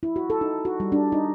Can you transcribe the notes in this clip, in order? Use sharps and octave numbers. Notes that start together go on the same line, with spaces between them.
E4
F#4
A4
D#4
F#4
G3
D4
D#4